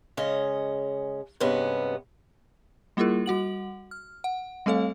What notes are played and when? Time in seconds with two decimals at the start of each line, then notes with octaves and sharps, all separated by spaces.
0.17 C#3 G#3 C#4 D#5
1.40 G2 C3 G#3 B3 C#4
2.97 G3 A#3 E4 F4 G#4 A#4
3.26 G3 F#4 F#5 F#7
3.91 F6
4.24 F#5
4.66 G3 A3 C4 A4 C#5 F5